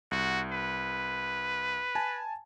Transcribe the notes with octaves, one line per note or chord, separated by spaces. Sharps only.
C2 F#4
B4
G#5 A5